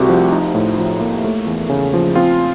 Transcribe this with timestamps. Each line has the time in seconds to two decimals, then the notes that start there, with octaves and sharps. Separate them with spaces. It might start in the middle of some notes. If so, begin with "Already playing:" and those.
Already playing: C2 C3 A3 F#4 G4
0.09 F3
0.32 D#4
0.55 A2
0.78 F3
1.00 A#3
1.24 A3
1.47 E2
1.69 C#3
1.94 F3
2.15 C4 F4